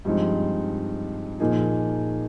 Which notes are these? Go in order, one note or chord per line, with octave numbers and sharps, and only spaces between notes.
G2 F3 G#3 C4 D#4
A#2 F3 A#3 D#4 G#4